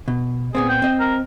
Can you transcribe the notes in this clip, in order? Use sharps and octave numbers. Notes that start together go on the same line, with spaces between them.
B2
A#2 B3 C4 G#4
G5
C4 D#5
A#4